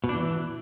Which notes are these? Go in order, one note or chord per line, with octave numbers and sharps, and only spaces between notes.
B2
D4
E3